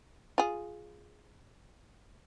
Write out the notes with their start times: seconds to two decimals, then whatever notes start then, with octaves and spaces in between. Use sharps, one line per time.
0.38 F4 G#4